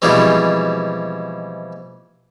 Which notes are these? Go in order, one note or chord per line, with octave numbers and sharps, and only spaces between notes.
B2 E3 F3 G3 G#3 C4